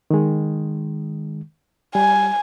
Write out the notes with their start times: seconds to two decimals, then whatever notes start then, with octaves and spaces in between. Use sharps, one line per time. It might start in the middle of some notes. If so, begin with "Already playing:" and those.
0.10 D#3 G#3
1.95 G3 G#5